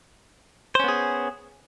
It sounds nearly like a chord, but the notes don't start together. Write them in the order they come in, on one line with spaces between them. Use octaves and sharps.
C5 C#4 B3 G#4